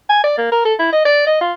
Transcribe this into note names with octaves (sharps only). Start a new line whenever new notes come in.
G#5
D5
A#3
A#4
A4
E4
D#5
D5
D#5
F4